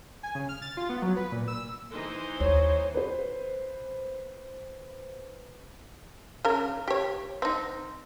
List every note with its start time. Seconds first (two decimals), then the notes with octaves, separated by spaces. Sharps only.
0.23 G#5
0.35 C#3
0.49 F6
0.62 A6
0.77 F4
0.89 B3
1.02 F#3
1.16 B4
1.32 A#2
1.48 E6
1.91 E3 D#4 C5
2.40 D#2 C#5
2.95 B4 C5
6.45 C#3 A#4
6.88 G4 C#5
7.42 C4 D#4